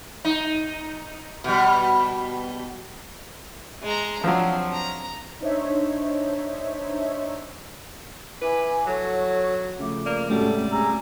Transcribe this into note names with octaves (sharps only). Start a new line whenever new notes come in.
D#4
B2 G3
G#3 A#5
F3 F#3 C4 D4
A#5
D4 D#4 C5 C#5 E5
E4 B4 G#5 D6
F#3 F#4 A4 C#5
C#3 F3 A3 D6
A#3 D5
G#2 C3 F#3 G3 A3 C#4 F#4 A4
G#4 A#5 E6